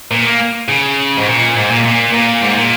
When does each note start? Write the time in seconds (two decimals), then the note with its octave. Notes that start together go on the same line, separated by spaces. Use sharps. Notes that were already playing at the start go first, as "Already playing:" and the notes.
0.11 A#2
0.25 A#3
0.68 C#3
1.17 G#2
1.27 A#2
1.55 G#2
1.70 A#2
1.84 A#2
2.13 A#2
2.42 G#2
2.57 A#2